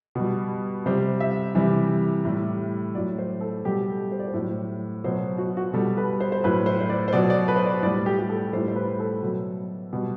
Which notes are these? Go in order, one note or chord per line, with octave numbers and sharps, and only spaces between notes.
B2 G3
C3 G3 C5
E5
C3 E3 G3
A2 G3
A2 F#3 D5
C5
A4
B2 G3 G4
A4
C5
D5
C5
A2 F#3
B2 F#3 C5
F#4
F#4
B2 G3 A4
B4
C5
C5
A2 F#3 B4
C5
C5
D5
C5
B2 F#3 D5
D5
B4
C5
D5
A2 G3 D5
G4
G4
A4
A2 G3 C5
C5
B4
A4
B2 F#3
B2 G3